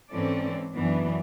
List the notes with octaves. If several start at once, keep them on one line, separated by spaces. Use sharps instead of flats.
G#2 E3 C4 C#4 A4 D5
F#2 E3 B3 D4